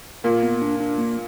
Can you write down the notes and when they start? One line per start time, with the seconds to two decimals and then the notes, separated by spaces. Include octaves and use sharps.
0.24 A#2 A#3
0.43 B3
0.62 D4
0.81 D4
0.98 A#3